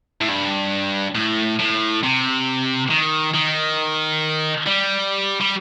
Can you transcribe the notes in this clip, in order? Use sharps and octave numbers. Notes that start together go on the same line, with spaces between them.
A2
G2
A2
A2
C3
D#3
D#3
G3
G3